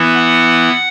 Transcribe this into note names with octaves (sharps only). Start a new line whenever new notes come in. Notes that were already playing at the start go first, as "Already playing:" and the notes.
Already playing: E3 B3 E4
F#5